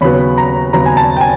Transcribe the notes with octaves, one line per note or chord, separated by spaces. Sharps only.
D#2 C#3 F#3 B3 B5
A#5
D#2 C#3 F#3 B3 A#5
G#5
A5
G5
G#5